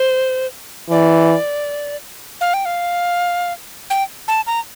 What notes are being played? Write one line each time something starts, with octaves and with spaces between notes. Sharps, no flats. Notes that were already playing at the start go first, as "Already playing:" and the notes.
Already playing: C5
E3 D5
F5
G5
F5
G5
A5
A#5